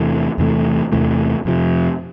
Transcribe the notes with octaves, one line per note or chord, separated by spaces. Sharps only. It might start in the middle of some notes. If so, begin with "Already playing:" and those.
Already playing: E2 C3 E3 A3
E2 C3 E3 A3
E2 C3 E3 A3
F2 C3 F3